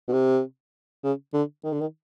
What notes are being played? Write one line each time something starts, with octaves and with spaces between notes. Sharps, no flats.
B2
C3
C#3
D3
D#3
D3
D#3